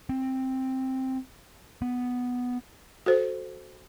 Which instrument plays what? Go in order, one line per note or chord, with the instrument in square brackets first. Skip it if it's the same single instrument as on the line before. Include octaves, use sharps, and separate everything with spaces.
[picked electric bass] C4
B3
[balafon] F#4 A4 C5